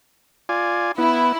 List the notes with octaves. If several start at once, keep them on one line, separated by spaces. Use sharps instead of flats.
F4 D5 G#5
B3 E4